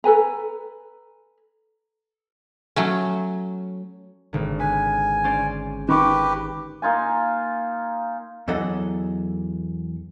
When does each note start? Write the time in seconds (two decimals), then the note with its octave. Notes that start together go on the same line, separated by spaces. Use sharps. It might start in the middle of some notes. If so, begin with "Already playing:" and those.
0.04 A4 B4 G#5 A#5
2.76 F#3 A3 C#4
4.33 G#1 D3
4.60 B4 G#5
5.24 C#4 C5 D5
5.89 D#3 G4 B4 C#6 D6
6.82 A#3 D#4 F4 G#5
8.48 E2 E3 F#3 A4 D#5 F#5